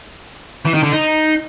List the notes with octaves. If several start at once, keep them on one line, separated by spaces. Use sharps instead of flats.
E3
D#3
D3
D#4